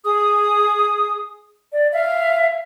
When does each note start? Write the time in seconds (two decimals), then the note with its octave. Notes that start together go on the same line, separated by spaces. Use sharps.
0.05 G#4 D#6
1.72 D5
1.93 E5 F5